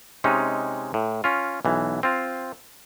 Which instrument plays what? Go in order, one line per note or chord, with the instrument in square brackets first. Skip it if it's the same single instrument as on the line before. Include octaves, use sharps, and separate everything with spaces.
[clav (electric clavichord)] C3 G#3 C#4 D#4
A2
C#4 F4
B1 E3
C4 F4